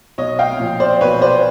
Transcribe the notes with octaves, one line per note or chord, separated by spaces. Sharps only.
B1 C#5 D#5
F5 G5
A#2 F3
C5 D5
B1 B4 C#5
C5 D5